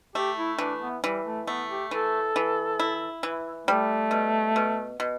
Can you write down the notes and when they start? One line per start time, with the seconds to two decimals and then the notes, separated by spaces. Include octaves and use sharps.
0.15 A3 G4
0.37 E4
0.58 E3 D4
0.81 B3
1.04 E3 G3
1.25 A3
1.47 A3 B3
1.69 G4
1.91 E3 A4
2.36 E3
2.79 E4
3.23 E3
3.67 G3 A3
4.11 B2
4.56 B2
5.00 B2